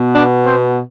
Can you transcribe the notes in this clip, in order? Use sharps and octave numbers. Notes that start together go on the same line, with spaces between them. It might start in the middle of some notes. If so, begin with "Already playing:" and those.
Already playing: B2 B3
D4 D5
C4 C5